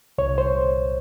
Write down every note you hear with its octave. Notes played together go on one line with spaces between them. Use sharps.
C2 C#5
C5